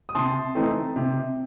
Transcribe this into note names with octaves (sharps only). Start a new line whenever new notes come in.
D#6
C3 A5 C6
E3 A3 C4 D#4
C3